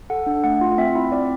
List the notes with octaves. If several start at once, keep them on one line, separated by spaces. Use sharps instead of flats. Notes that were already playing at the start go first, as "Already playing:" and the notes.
A4 F#5
D4
A3 F#5
F4
C4 E5
E4
C4 D5